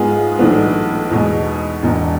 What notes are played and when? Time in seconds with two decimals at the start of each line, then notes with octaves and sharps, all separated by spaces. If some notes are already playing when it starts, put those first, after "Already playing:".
Already playing: G#2 G#3 B3 F4 G#4
0.38 B1 A2 E3 B3 D4
1.11 E2 B2 G#3
1.83 E1 E2 B2